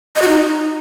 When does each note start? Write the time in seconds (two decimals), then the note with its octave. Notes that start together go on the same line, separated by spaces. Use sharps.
0.16 D#5
0.22 F#4
0.28 D#4